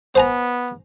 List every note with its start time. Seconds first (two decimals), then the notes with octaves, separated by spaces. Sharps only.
0.15 B3 C5 G#5 A#5